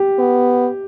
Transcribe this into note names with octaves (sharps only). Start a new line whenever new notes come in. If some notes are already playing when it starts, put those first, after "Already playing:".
Already playing: G4
B3